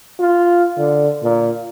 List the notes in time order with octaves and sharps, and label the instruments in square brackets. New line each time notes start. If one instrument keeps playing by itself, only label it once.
[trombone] F4
D3
A#2